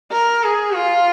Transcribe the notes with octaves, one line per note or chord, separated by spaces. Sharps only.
A#4
G#4
F4